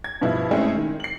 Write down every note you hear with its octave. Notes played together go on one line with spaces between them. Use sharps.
G#6
G2 B2 F3 E4
G#3 A3 C4 C#4 E4 G#4
D#3
C7 F#7